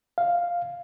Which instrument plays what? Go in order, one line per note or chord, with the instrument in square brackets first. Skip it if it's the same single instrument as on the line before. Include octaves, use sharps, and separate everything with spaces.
[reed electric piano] F5